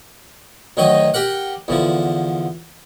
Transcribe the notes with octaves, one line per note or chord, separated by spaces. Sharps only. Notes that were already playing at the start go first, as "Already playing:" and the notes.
D2 D#3 F#3 D#4 D#5
G4 A#4 F#5
E2 D3 F3